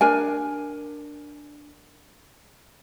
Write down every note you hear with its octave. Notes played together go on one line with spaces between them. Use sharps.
D4 A#4 G#5